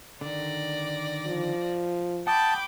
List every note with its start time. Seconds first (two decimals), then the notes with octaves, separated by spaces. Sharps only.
0.21 D3 D#3 D5 A#6
1.26 F3
2.27 F#5 G5 A5 B5 D6 D#6